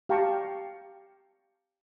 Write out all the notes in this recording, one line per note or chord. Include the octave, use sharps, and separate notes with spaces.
G4 F5 G5 A5 A#5 C#6